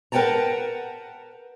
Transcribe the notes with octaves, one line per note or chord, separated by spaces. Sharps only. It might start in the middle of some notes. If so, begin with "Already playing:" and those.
A#4 B4 F#5 G5 A5 A#5